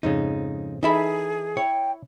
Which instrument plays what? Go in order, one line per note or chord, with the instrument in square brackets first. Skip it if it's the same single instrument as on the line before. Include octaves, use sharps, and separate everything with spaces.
[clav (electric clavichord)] F2 G#2 C#3 [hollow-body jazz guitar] D#4
[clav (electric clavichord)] E3 A4 [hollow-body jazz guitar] D#4 E5 B5 [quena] G#4
[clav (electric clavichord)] E4 [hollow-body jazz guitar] C#5 [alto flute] G5